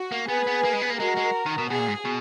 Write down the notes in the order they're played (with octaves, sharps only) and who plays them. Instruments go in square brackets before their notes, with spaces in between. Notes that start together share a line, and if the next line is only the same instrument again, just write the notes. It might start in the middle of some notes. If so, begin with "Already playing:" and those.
Already playing: [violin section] F#4
[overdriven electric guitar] A#3
[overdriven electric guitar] B3 [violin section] G#4 B4
[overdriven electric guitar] B3
A#3
G#3
B3
A#3
[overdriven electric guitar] G#3 [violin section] F#4 A#4
[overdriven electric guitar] G#3
D#3
B2
[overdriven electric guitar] B2 [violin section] G#4
[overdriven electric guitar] A#2
G#2
B2